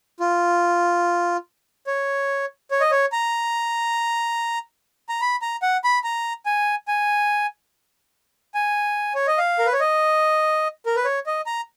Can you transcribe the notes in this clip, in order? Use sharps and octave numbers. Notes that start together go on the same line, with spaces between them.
F4
C#5
C#5
D#5
C#5
A#5
A#5
B5
A#5
F#5
B5
A#5
G#5
G#5
G#5
C#5
D#5
F5
A#4
B4
C#5
D#5
A#4
B4
C#5
D#5
A#5